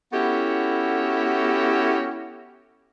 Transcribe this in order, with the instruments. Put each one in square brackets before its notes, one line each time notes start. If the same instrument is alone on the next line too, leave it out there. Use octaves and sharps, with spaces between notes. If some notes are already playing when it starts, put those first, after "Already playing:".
[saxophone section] B3 C#4 E4 F#4 G4 A4